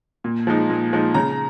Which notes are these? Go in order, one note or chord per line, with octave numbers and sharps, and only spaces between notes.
A#2
F3 G#3 D#4
A#2
F3 G#3 D#4
C#3 A#5